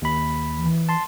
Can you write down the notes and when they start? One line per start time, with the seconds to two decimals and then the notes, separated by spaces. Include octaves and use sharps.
0.02 D#2 B5
0.58 E3
0.89 A5 C6